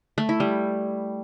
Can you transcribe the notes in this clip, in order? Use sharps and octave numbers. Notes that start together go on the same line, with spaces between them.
A3
E4
G3